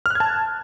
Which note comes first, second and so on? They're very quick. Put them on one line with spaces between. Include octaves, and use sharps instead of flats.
F6 F#6 G#6 A5